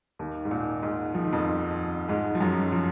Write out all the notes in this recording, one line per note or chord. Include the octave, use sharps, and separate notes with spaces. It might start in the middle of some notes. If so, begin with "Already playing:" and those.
D#2 D#3
G#2
A#2
G#2 G#3
F3
D#3
F2 F3
G#2 G#3
F3
F#2 F#3
F3